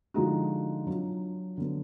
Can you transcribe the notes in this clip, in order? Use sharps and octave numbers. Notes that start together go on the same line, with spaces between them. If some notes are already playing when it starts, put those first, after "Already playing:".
D3 F3 G#3 D#4 F#4
F#3 D4 F4
D3 F#3 B3